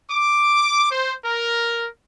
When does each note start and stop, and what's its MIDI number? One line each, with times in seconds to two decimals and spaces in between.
0.10 0.86 86
0.90 1.14 72
1.25 1.89 70